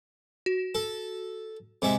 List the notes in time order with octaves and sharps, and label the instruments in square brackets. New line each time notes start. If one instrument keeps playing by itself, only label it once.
[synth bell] F#4
[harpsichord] A4
C3 G#3 E5